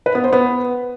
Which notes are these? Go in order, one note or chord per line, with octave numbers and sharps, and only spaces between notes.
B4
B3
C5
B3